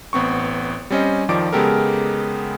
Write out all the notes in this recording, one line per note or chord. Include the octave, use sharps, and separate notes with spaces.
A1 B3 C4 C#6
G3 C4 C#4 C5 D#5
F2 D#3 F3 D5 D6 D7
C#3 G#3 B3 G4 A4 A#4